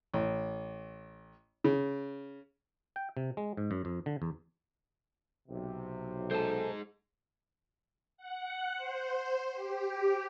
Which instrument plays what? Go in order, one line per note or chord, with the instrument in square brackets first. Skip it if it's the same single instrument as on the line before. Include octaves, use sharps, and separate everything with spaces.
[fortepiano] A1
C#3
[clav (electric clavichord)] G5
C3
G#3
G#2
F#2
F2
D3
E2
[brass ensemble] B1 C3
[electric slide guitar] G#3 D#4 [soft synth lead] A4 [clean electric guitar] C5 A5
[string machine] F#5
C5
G4